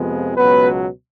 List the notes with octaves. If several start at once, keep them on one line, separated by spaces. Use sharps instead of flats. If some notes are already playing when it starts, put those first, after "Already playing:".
Already playing: F2 C3 F3 G#3 B3
C#2 B2 F#3 B3 B4